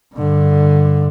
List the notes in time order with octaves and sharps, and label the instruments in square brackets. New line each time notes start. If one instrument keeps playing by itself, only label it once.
[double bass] G2 D3